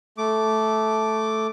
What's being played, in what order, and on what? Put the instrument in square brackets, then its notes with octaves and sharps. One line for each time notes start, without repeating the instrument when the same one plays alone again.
[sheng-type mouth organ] A3 D6